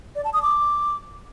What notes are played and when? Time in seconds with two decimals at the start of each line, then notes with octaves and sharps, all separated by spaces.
0.15 D5
0.24 A5
0.33 D#6
0.42 D6